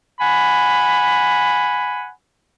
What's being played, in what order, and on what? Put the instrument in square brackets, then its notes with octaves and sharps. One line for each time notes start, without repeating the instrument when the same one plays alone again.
[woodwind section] F#5 G#5 B5